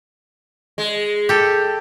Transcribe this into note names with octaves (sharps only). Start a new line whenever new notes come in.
G#3
G4 A4